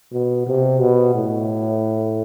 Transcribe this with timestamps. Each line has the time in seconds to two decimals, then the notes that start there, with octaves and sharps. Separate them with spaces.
0.12 B2
0.47 C3
0.80 B2
1.15 A2